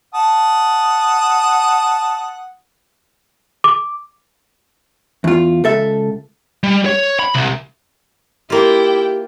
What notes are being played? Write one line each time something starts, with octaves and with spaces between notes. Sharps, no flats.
F#5 A5 D#6
D6
E2 F4
C#2 A4 E5
G3
C#5
B5
C2
A#3 E4 F4 G4 G5